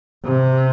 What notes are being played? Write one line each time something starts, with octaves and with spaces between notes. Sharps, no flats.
C3